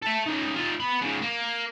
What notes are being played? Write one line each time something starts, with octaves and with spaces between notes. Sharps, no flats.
A4 E5
C#3 D#4
D#4 F4
B3 B5
G#2 C#3
A#3